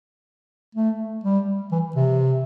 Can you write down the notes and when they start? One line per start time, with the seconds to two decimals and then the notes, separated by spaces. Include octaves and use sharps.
0.75 A3
1.24 G3
1.72 E3
1.96 C3